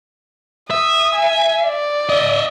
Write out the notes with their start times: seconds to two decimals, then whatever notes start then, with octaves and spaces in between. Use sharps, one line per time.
0.70 E5 D#6
1.15 G#5
1.67 D5
2.09 D#5 E5